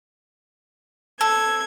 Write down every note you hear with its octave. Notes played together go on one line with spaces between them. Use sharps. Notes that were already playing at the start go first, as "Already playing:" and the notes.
A4 G#6